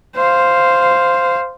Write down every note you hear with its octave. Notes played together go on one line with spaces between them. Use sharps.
C5 F5